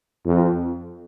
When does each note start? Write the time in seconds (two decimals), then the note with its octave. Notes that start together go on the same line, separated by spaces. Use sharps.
0.26 F2